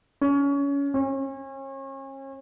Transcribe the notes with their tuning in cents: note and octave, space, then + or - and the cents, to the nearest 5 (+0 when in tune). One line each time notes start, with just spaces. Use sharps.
C#4 +25
C#4 -35